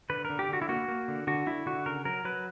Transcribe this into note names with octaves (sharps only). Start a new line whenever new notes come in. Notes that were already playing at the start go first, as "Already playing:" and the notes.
D3 B4
D3 A#4
G4
D3 F#4
E4
A#3 F#4
A#3
D3
D3 F#4
D3 E4
D3 F#4
C#3 A#4
F#3 A#4
F#3 B4